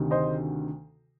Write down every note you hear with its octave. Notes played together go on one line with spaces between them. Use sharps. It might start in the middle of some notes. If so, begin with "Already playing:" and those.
Already playing: D2 C3 D#3
C5 D#5